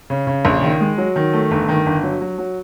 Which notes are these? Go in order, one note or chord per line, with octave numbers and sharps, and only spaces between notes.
C#3
C#3
A#1
D#3
G#3
F#3
D#3
A3
G1
D#3
G1
F#3
F#3
F#3